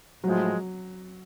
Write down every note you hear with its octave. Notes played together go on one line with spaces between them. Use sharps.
A2 F3 F#3 G#3